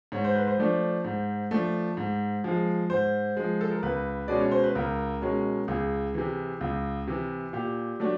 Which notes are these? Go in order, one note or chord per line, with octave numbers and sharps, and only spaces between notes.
G#2 C#5
C5
B4
C5
F3 A3 D4
G#2
F3 A3 D4
G#2
F3 G#3
G#2 C5
F3 G#3
A4
A#4
C#2 B4
B2 G#3 C#4 D5
C#5
C5
B4
C#2 A#4
B2 G#3 C#4
C#2 G#4
C3 E3
C#2
C3 E3
A#2 G4
F#3 A3 D4